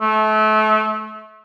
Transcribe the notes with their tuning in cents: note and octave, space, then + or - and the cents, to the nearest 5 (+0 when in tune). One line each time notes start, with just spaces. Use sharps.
A3 -30